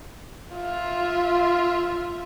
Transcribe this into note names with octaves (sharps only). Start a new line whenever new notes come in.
F4 E5